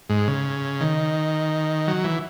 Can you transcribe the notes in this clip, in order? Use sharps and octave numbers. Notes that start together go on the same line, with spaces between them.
G#2
C#3
D#3
F#3
E3